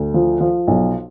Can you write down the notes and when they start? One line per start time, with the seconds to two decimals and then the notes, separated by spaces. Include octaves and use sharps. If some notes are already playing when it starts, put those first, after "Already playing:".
Already playing: D2
0.14 F3
0.40 F3
0.67 B1